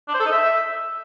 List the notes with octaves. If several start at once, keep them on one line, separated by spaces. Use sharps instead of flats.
D4
C5
A4
D#4
E5